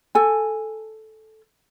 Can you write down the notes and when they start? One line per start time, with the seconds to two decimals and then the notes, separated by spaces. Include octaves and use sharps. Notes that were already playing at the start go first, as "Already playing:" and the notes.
0.15 A4 G#5